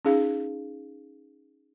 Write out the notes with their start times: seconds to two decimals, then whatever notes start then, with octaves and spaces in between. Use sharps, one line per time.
0.05 C#4 D#4 G#4 F5